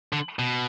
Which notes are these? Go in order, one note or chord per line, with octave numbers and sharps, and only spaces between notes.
D3
B2